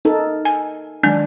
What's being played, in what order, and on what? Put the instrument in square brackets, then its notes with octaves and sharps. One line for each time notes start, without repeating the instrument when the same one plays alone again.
[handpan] D#4 A4 A#4
[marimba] G#5
[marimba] D#3 F#3 G#3 [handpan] D4